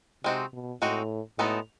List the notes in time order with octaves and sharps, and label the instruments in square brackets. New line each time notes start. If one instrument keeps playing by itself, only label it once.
[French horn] C3 [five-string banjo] G#3 C4 D#4 F#4
[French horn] B2
[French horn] A2 [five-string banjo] G#3 C4 D#4 F#4
[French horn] A2 [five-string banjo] G#3 B3 D#4 F#4 A4